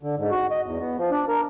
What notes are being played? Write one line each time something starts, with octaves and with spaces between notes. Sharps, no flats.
D3
G#2
F#4
D#5
E2
B3
F3
D4
A#4